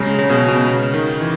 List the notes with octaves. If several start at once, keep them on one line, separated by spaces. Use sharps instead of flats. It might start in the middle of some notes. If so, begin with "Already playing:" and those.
Already playing: C#3 F#3 G#3
C#3
B2
B2
C#3
D#3
E3